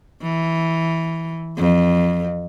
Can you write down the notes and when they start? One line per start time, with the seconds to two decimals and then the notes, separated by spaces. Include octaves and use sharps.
0.23 E3
1.58 F2